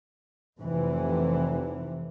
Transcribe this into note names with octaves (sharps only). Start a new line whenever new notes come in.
F1 C3 E3